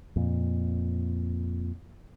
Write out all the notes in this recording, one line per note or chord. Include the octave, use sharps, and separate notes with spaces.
F2 A#2